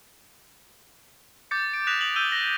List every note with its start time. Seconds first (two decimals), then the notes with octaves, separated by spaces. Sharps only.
1.51 D6 G6 A6 C#7
1.73 D7
1.87 D#6 F#6 A#6 B6 E7 F7
2.01 D#6 F7 F#7
2.16 D#6 E6 G6 D#7 G7
2.32 A#6 G7